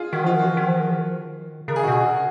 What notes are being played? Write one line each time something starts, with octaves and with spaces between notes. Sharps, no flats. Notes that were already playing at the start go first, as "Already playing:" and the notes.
Already playing: F4 G#4
D#3 F#4
F3 F4
D#3 F#4
F3
D#3
F3
D#3
F3
D#3
C#3 A#4
G#4
F#4
B2 G#4